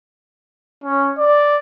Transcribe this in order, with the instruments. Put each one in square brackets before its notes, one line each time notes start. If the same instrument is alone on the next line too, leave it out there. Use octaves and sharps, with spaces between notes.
[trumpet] C#4
D5